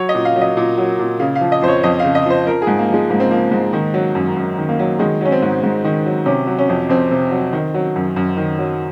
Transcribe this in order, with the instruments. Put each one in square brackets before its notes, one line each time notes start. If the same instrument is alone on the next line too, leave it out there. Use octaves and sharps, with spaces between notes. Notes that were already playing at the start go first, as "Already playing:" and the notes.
Already playing: [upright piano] F#3 C#5
D#5
A#2
F5
F#3
D#5
A#2
F#3
A#2
C#3 F5
F5
F3
D#5
F2 C5
C#5
F2 D#5
C#3 F5
D#5
F3 C5
F3 A#4
G#4
G#2
A#3
F3 G#3
G#2 A#3
C4
F3 A#3
G#2
D#3
F#3
F#2
F#2
D#3
A#3
F#3
D#3 G#3
F#3 C#4
C4
G#2
G#2
D#3
F#3
C3 C#4
F#3
C#4
F2
F2 C4
C3
F#3
D#3
F#3
F#2
F#2
D#3
F#3